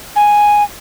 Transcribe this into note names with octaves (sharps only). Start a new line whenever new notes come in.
G#5